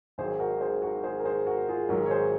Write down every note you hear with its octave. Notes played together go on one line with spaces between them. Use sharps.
G#1 G#2 D#3 F#3 G#4 C5
F#4 A#4
G#4 C5
F#4 A#4
G#4 C5
A#4
G#4 C5
F#4 A#4
F4 G#4
G#1 G#2 F#3 F#4 A#4
C#5
G#4 C5